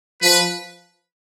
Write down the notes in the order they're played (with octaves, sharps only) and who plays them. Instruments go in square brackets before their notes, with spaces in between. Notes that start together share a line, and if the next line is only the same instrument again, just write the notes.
[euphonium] F3 [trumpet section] B4